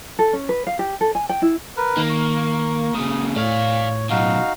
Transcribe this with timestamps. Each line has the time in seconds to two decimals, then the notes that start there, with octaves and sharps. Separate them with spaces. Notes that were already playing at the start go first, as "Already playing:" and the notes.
0.19 A4
0.33 C#4
0.49 B4
0.67 F5
0.79 G4
1.01 A4
1.15 G#5
1.29 G5
1.42 E4
1.77 A#4 B4
1.97 D#3 A#3
2.10 C#6
2.95 A#2 C#3 D#6
3.36 A2 C#5 D5 F5
4.10 F#2 B2 D#4 F#4 F5